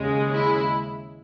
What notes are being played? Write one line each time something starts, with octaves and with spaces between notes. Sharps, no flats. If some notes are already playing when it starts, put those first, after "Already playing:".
Already playing: D#2 C#3 G#3
E4